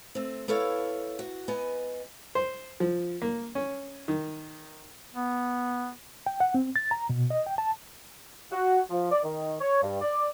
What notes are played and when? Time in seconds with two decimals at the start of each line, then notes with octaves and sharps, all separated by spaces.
0.15 A3 C4
0.48 B3 E4 A4 C#5 F5
1.19 F#4
1.48 B3 D#5 G#5
2.35 C5
2.80 F3
3.22 A#3
3.55 C#4
4.08 D#3
5.14 B3
6.26 G5
6.40 F#5
6.54 C4
6.76 A6
6.91 A#5
7.09 B2
7.30 D#5
7.46 G5
7.58 A5
8.52 F#4
8.90 F3
9.11 D5
9.23 D#3
9.60 C#5
9.82 G2
10.01 D5